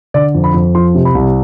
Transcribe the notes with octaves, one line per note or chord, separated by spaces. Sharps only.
D3 D5
F2
B5
F2
F3 C6
C3
B5
C2